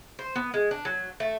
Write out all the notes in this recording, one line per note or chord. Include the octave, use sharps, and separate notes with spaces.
C5
B3
G#3
D4
F#3
A3